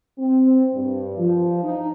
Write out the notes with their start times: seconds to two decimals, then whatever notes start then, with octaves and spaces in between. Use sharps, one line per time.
0.18 C4
0.74 G2
1.18 F3
1.63 D#4